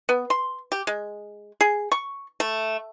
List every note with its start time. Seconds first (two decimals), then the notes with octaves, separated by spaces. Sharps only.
0.09 B3
0.30 C6
0.72 G4
0.87 G#3
1.61 G#4
1.92 C#6
2.40 A3